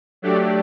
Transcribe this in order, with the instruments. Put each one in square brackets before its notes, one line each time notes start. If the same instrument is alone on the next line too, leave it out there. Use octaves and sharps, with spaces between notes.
[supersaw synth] F#3 A3 D4 G4 D5